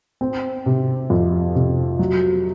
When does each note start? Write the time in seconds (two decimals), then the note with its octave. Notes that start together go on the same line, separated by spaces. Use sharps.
0.21 C4
0.66 C3
1.10 F2
1.55 C3
1.99 F#3